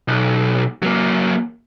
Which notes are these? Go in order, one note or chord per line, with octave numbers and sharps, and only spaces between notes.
B1
F#3 A#3